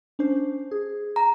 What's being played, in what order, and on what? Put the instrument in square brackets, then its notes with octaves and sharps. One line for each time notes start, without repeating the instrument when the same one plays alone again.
[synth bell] C#4 D4 C5
G#4
[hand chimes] A#5